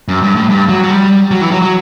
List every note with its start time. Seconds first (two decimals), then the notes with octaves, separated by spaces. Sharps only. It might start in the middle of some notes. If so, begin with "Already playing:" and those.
0.08 F#2
0.22 G2
0.36 A2
0.49 G2
0.69 F#3
0.83 F#3
0.90 G3
1.31 F#3
1.41 E3
1.51 F#3
1.62 F#3